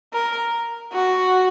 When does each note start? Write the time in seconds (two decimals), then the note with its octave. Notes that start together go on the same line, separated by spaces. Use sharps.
0.13 A#4
0.93 F#4